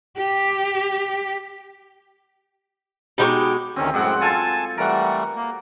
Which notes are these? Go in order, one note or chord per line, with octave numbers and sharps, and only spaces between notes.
G4
B2 D3 G#3 D#4 G4 C#6
D2 D#3 C4 C#4
F#2 A2 G#3 C4 F#5
F4 A4 G#5 A5
E3 G3 A3 A#4 F#5
A#3